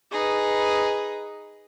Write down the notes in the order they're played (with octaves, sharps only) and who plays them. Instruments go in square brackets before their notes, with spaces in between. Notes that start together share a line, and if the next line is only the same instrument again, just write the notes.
[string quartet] D#4 G#4 B4